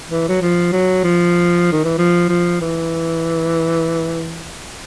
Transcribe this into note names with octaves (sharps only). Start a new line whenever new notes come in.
E3
F#3
F3
F#3
F3
D#3
E3
F3
F3
E3